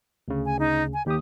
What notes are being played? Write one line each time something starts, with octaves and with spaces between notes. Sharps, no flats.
D2 C#3
G#5
D#4
G#5
D#2 G4 D#6